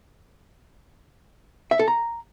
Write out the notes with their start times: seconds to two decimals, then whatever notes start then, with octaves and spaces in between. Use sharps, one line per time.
1.71 E5
1.79 A4
1.88 A#5